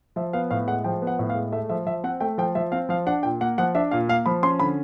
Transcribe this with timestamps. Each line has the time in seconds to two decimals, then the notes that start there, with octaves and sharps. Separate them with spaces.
0.16 F3 E5
0.33 B3 F5
0.51 A2 F5
0.67 G#3 F#5
0.84 F3 G5
1.02 B3
1.07 F#5
1.19 A2
1.30 F5
1.35 G#3
1.52 A3 E5
1.69 F3 E5
1.86 F3 E5
2.04 C4 F#5
2.20 A3 G5
2.38 F3 G5
2.55 F3 E5
2.72 C4 F5
2.89 F3 F5
3.06 D4 F#5
3.23 A#2 G5
3.40 A#3 F#5
3.58 F3 F#5
3.75 D4 E5
3.91 A#2 F5
4.08 A#3 F5
4.26 F3 B5
4.43 C#4 C6
4.60 D3 B5